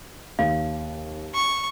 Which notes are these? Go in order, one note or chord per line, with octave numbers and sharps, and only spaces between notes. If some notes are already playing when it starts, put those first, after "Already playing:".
D#2 F5
C#6